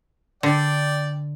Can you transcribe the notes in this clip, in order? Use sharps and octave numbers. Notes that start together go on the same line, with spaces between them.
D3 D5 G5